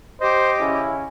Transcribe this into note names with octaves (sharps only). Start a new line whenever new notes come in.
G4 C5 D#5
C#3 C#4 E4